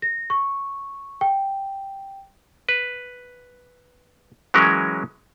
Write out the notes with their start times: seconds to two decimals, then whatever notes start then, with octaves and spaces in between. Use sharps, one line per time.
0.02 A#6
0.30 C#6
1.21 G5
2.69 B4
4.54 E3 F#3 G#3 C#4 A#4